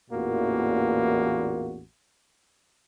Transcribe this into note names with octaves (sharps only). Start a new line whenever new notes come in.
A1 E2 A#2 A#3 F#4